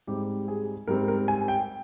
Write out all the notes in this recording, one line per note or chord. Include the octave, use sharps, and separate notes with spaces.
G#2 G3 C4 G4
G#4
G#2 G3 C4 A#4
A#4
G#5
G5